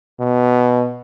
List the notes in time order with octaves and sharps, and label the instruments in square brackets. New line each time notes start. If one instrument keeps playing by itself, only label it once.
[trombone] B2